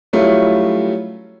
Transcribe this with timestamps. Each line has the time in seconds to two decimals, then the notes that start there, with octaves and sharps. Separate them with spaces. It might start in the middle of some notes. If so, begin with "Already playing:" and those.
0.13 F#3 G3 A3 C#4 E4 F4